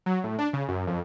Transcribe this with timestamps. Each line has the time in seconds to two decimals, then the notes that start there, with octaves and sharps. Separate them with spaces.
0.06 F#3
0.24 A2
0.38 D4
0.53 C#3
0.68 F#2
0.87 F2